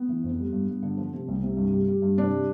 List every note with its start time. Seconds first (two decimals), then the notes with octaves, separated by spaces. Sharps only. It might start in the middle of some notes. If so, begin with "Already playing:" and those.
Already playing: B3
0.09 E3
0.24 F2
0.39 G3
0.53 G2
0.68 G2
0.83 D3
0.97 F3
1.13 C3
1.28 C2
1.43 C3
1.57 G2
1.72 G3
1.88 G3
2.02 G2
2.17 C3 D4
2.33 G3